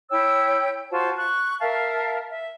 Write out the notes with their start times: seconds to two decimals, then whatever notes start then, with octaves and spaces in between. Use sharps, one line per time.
0.10 E4 C#5 G5 E6
0.92 F4 F#4 C5 A5
1.17 C#6 F#6
1.60 A#4 E5 F5 A5
2.29 E5